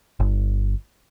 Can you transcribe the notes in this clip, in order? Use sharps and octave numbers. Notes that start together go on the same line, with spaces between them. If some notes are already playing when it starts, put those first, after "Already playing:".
G1